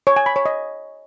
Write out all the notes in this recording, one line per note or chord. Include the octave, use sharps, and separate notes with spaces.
C#5
G#5
B5
C#5
D#5